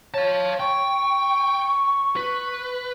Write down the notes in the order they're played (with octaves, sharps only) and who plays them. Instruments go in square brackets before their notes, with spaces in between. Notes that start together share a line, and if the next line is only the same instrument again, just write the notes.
[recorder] C#5 [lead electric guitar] F5 A5
[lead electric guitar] G5 [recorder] C#6
[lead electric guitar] B4